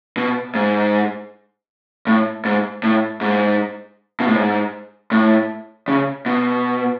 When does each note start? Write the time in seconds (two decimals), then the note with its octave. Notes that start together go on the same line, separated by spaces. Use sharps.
0.17 B2
0.55 G#2
2.07 A2
2.45 G#2
2.83 A2
3.21 G#2
4.20 B2
4.28 A2
4.35 G#2
5.12 A2
5.88 C#3
6.26 B2